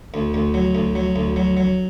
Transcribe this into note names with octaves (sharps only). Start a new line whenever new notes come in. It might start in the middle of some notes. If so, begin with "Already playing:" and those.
D2
D2
F#3
D2
F#3
D2
F#3
F#3